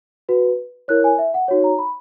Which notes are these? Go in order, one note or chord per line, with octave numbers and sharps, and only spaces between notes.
F#4 B4
E4 A#4 C#5 F#6
G#5
E5
F#5
D#4 F#4 C#5
A#5
B5